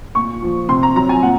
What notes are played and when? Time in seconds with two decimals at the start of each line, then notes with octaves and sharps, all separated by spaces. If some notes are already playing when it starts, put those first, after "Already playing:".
0.15 A#2 C#6
0.42 F3
0.69 C3 C6
0.83 A#5
0.96 F#3 A#5
1.09 G#5
1.23 A#2 F#5